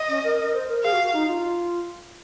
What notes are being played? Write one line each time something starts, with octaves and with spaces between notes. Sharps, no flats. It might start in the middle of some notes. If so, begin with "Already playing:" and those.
Already playing: D#5
C#4
A#4
A#4
C5
A#4
G#4 F5
F#4
F#4
D#4
F4